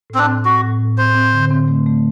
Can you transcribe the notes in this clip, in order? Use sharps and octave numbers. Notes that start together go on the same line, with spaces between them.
A2 C4
D4
C4
C4 F#4
A2
A2
C4 C5
C4
D3
C4
A3
A3